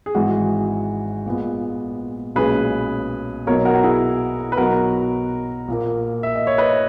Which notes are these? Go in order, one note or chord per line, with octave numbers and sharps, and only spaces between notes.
G#4
G#1 G#2 E3 G#3 F#4
A#1 A#2 G#3 B3
B1 A#2 G#3 C#4 G#4 B4
B1 B2 F#3 B3 D#4 A#4 C#5
F#4 A#4
F#4
E4 G#4
B4
B1 B2 F#3 B3 D#4 F#4 A#4
A#1 A#2 A#3
E5
D#5
C#5
B4 D#5